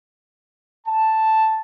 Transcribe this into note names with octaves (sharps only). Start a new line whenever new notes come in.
A5